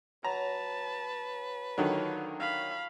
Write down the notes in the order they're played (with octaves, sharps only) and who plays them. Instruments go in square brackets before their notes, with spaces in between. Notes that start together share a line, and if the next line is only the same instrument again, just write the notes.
[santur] F#3 [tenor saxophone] B4 [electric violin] A5 [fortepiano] A#5
[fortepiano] D3 D#3 F#3 [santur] A3 F4 C#5
[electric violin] F5 B5